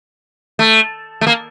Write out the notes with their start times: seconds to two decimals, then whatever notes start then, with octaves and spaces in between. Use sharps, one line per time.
0.59 A3
1.21 A3
1.27 A#3